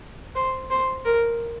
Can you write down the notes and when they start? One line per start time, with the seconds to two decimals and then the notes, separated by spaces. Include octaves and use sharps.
0.35 C5
0.70 C5
1.05 A#4